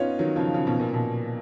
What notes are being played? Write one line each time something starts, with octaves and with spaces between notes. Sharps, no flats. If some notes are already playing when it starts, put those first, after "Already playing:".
Already playing: B3 C#4 D#4 F4
D#3 F#3
C#3 F3
C#3
B2
A#2
B2